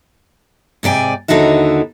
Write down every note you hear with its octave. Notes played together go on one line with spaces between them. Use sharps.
G#2 C3 D5 G5 G#5
D#2 D3 D#4 E4 F#4 E5